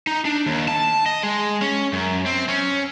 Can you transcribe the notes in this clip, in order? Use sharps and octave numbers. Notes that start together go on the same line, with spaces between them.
D#4
D4
D#2
A5
D#5
G#3
C#4
F#2
C4
C#4